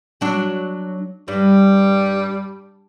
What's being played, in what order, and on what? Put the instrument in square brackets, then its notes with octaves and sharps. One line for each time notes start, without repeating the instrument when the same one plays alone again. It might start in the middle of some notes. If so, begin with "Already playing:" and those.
[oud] F#3 D4
[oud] G2 [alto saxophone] G3